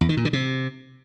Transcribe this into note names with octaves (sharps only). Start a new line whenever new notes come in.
E2
D#3
A#2
D3
C3